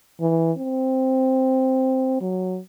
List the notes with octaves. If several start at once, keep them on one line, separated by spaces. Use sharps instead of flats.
E3
C4
F#3